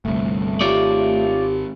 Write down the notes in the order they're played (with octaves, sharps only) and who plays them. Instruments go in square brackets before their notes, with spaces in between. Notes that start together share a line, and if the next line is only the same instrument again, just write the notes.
[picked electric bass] G1 C2 [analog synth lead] A3
[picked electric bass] G#1 [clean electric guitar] F4 C#5 D5 [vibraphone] G4